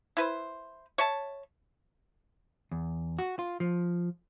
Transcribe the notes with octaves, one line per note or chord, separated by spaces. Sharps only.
E4 B4 C5
C#5 E5 A5
E2
F#4
F4
F3